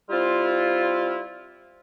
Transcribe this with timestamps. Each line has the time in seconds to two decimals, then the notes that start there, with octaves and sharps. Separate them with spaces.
0.10 G3 C4 E4 F4